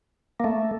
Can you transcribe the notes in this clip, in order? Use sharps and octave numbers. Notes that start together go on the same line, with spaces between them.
A#3
A3